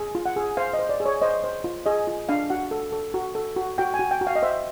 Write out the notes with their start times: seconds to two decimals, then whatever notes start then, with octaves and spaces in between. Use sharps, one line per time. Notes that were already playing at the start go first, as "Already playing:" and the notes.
Already playing: G#4
0.15 F4
0.26 F#5
0.36 G#4
0.57 C5 F5
0.73 D#5
0.79 C5
0.89 D5
1.00 G#4
1.06 C#5
1.22 C5 D#5
1.44 C5
1.64 F4
1.86 G#4 D#5
2.07 F4
2.29 D4 F5
2.50 F#4 F#5
2.71 A4
2.92 A4
3.14 F#4
3.35 A4
3.56 F#4
3.78 F#4 G5
3.94 G#5
3.99 F#4
4.11 G5
4.21 F#4
4.27 F5
4.36 D#5
4.43 C5 E5